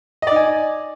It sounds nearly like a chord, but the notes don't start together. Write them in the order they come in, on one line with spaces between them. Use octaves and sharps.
D#5 D5 D#4 G#5